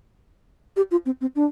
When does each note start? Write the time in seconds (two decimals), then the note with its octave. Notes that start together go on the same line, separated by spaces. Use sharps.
0.76 G4
0.91 F4
1.06 C4
1.21 C4
1.36 D4